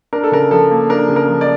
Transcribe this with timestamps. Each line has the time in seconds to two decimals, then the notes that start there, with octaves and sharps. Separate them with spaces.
0.13 D4 A#4
0.23 A4
0.32 C#3 A#4
0.51 F3 A4
0.71 A#3
0.89 D4 A#4
1.09 C#3
1.16 A#4
1.28 F3
1.41 D5